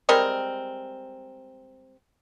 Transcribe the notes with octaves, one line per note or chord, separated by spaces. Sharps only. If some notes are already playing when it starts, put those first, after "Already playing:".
G3 G#3 C4 A#4